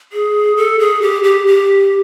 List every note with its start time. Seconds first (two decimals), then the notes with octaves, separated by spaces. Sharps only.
0.13 G#4
0.57 A4
0.79 G#4
1.02 G4
1.24 G4
1.47 G4